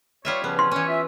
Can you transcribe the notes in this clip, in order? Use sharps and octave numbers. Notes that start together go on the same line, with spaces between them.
G3 F4 C#5 E5
C#3 F3 B3 C#4
C6
E3 C#4 C#5
F4 E5